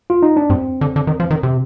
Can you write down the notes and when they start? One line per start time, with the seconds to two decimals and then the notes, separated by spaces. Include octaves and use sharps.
0.10 F4
0.22 D#4
0.37 D4
0.50 G2 C4
0.81 D3
0.96 D3
1.07 D#3
1.20 F3
1.31 D#3
1.43 C3